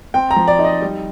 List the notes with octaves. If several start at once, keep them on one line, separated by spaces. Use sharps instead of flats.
C4 G5
A#5
F3
D5
D#4
D#5
G3